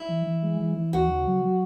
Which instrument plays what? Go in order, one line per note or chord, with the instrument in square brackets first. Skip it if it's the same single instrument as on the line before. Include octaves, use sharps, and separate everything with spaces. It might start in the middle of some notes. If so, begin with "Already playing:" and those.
Already playing: [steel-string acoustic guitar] E4
[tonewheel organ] E3
E3
G#3
E3
E3
[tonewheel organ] D#2 [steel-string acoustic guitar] F#4
[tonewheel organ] C#3
F#3
F#3